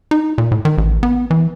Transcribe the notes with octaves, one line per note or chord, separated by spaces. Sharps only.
D#4
A#2
A2
D#3
A1
B3
E3